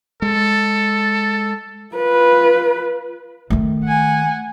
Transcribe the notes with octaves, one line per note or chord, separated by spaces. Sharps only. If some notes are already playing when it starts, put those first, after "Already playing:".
G#3 A4
F4 B4
D#3 A3
F#5 G#5